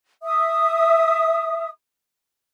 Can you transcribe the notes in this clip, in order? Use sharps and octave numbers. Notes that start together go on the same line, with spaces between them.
E5 D#6